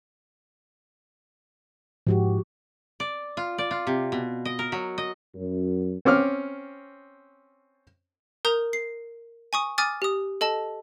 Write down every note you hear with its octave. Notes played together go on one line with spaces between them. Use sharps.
G#2 F3 F#4 G4
D5
F4
D5
F4
C3
B2
D#5
A#4
F#3
D#5
F#2
C4 C#4 D6 F6
A#4 A#5 D#6 G6 F7
C7
G#5 C#6 D#6
G#5 D6 D#6 F6 A6
G4 D#6
A4 D#5 A5